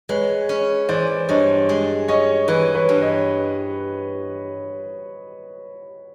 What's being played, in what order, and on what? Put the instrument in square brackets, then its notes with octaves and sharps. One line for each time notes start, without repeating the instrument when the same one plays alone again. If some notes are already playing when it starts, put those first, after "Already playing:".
[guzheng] G#3 [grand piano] B4 C#5
[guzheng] C#4
[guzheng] E3 [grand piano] C5 D5
[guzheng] G2 [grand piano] C#5 D#5
[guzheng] G#3
[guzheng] C#4 [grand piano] C#5 D#5
[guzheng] E3 [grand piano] B4 C#5
[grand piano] B4 C#5
[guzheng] G2
[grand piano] C#5 D#5